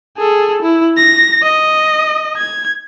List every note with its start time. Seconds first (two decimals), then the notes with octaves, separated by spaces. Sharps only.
0.17 G#4 A4
0.62 E4
0.97 A#6
1.42 D#5
2.37 G#6